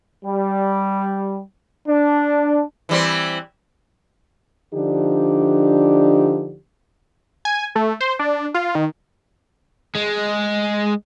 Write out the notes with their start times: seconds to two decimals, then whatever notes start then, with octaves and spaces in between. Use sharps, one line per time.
0.24 G3
1.88 D4
2.89 E3 G3 C4
4.73 D3 F3 D4 D#4 G4
7.45 G#5
7.75 A3
8.00 C5
8.19 D4
8.54 F4
8.75 D#3
9.95 G#3